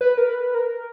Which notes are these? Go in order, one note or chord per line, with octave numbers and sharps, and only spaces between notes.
B4
A#4
B4
A#4